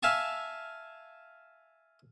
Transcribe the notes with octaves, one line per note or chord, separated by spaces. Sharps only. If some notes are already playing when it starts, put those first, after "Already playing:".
E5 F5 G#5 A5 C#6